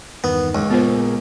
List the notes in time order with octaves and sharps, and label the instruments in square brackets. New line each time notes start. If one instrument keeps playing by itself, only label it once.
[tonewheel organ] E2 G2 D#3 [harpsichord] B3
[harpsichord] C#2
[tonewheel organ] A#2 G#4 A#4 [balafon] B3 F4 C5